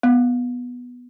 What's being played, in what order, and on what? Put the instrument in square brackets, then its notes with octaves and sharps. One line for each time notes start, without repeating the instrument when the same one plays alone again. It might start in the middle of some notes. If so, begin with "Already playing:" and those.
[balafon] B3